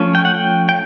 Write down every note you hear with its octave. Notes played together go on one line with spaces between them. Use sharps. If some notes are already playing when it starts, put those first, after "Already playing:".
Already playing: F3 A3 C#4
G5
F#5
G5
G5